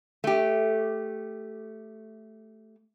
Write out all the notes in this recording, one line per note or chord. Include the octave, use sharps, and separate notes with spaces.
A3 G4